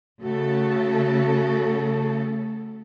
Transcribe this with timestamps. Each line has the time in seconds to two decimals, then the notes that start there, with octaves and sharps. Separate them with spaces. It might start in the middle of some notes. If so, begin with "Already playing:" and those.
0.22 C#3 A3 F#4 A4